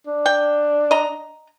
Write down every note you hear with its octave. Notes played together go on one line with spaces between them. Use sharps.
D4
G5
D#5 A#5